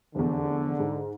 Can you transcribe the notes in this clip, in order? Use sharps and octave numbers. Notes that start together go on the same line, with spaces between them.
F1 E2 D3
G#2